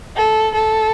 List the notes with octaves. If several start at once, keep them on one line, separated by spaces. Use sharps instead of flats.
A4
A4